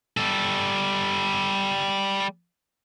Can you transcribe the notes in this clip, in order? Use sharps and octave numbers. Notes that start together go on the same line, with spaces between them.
G3 A4